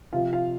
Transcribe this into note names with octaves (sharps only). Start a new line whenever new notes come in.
C3 F3 F4 F5
F4 F5